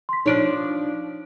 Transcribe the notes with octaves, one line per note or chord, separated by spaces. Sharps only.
C6 B6
F3 D4 D#4 C#5 D7